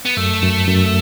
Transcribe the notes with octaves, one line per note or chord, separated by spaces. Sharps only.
B3
F#2 A3
F#2
F#2